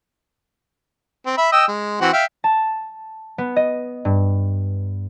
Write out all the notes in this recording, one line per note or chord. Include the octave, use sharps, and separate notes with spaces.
C4
E5 B5
D#5 G5 E6
G#3
E3 C4 F#4
E5 F5 G5
A5
B3
D#5
G2